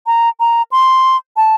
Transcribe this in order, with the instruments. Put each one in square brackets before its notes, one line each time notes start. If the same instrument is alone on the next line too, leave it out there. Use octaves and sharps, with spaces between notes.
[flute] A#5
A#5
C6
A5